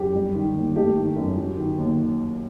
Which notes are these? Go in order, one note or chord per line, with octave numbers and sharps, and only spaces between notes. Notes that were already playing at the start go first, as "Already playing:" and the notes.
Already playing: F#2 G4
G3
D#3
D#2
A3 G4
D#3
F#2
F#3
D#3
D#2